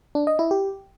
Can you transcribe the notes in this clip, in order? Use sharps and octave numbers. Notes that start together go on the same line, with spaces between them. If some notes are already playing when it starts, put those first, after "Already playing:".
D4
D#5
E4
G4